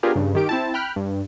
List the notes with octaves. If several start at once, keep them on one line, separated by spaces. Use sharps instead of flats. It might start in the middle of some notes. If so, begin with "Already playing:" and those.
B3 D4 F4 G4 G#4 A#4
G2 C#3
D#3 G4 D7
C4 E4 A5
G5 B5 F6 F#6
G2